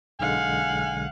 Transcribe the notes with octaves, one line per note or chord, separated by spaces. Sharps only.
B1 D3 G#3 F5 F#5 G#5